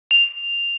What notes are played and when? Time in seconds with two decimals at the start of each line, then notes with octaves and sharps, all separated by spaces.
0.11 F7